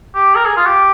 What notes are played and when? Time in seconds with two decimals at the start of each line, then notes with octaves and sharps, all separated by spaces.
0.15 G4
0.35 A#4
0.46 G#4
0.57 F4
0.66 G4